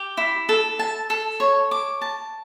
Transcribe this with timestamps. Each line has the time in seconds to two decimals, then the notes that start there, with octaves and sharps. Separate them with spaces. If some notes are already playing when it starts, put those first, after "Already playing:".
Already playing: G4
0.17 E4
0.49 A4
0.79 A5
1.10 A4
1.40 C#5
1.71 D6
2.01 A5